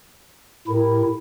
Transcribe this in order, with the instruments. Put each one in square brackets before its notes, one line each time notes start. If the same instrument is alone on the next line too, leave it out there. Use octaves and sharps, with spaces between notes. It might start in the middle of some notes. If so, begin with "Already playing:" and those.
[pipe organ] A2 E4 [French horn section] G4 A4 A#4